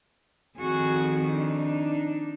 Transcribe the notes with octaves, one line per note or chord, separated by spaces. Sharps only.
F2 D#3 F#4 G#4
D4 D#4